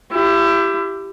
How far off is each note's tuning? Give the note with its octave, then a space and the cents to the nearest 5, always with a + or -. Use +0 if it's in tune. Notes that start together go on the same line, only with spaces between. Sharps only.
E4 +30 G4 +0